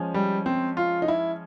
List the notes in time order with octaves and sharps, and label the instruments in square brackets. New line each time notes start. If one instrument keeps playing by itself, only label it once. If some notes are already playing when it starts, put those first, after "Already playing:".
Already playing: [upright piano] F3 G#3 C#4
[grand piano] G3
C4
F4
D#4
E4